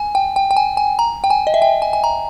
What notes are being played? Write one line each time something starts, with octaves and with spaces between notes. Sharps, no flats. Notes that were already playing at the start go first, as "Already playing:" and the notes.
Already playing: G#5
G5
G5
G5
G#5
G#5
A#5
G5
G#5
D#5
E5
G5
G#5
G#5
A#5